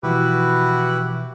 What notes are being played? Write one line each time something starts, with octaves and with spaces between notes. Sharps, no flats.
B2 E3 F3 E4 F#4 G4 B4